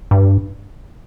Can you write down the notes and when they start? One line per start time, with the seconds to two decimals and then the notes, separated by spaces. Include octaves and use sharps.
0.11 G2